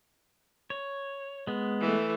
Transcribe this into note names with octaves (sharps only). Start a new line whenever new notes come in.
C#5
G#3 B3
E3 A3